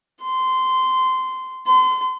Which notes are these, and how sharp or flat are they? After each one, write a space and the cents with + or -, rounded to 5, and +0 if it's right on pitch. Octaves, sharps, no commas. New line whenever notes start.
C6 -15
C6 -35